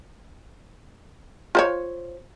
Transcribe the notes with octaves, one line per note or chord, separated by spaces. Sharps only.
F4 C5 C#5